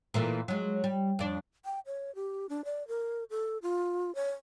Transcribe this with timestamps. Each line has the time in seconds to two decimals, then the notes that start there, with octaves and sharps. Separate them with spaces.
0.14 A#2 E3 A3
0.48 F#3 G#3
0.84 G3
1.19 F2 D4
1.65 G5
1.86 C#5
2.15 G4
2.49 D4
2.65 D5
2.88 A#4
3.30 A4
3.62 F4
4.15 C#5